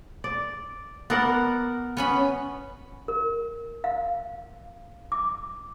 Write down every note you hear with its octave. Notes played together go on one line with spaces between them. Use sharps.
D5
B3 A#4 D5 F#5
B3 C#4 B5
A#4
F5
D6